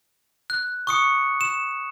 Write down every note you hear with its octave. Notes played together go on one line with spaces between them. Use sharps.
F#6
C#6 D#6 C#7
E7